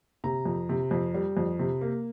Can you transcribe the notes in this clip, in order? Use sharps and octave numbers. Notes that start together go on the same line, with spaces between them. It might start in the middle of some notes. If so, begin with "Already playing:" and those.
C3 A#5
F2
C3
F2
G3
F2
C3
A#3